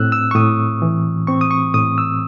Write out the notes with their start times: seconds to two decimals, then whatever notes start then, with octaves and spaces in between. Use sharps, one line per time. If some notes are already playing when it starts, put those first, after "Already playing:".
Already playing: A2 C4 E6 F#6
0.12 E6
0.31 C#6
0.35 A2 D#6
0.82 E3
1.27 C4 C#6
1.41 D#6
1.51 C#6
1.74 A2 D#6
1.98 E6